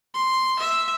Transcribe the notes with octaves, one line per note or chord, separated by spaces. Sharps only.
C6
E5